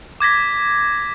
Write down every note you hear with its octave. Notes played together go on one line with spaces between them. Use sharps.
D6 G#6 A#6 B6